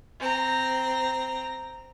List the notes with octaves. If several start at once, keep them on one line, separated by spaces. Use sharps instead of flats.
C4 A#5